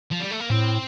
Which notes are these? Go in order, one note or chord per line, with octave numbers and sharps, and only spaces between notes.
F3
G3
A3
A#3
A2 C4